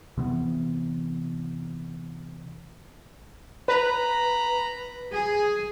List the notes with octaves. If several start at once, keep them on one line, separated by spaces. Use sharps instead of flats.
C3 E3 B3
B4 A#5 B5
G#4